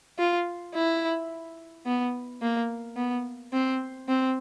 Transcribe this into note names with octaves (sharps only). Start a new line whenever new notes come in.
F4
E4
B3
A#3
B3
C4
C4